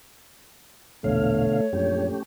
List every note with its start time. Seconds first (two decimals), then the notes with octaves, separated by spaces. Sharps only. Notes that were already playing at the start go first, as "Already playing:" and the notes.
1.04 A#1 E2 B2 D3 A3 C#5 F5
1.73 A#1 F#2 A3 C#4 G4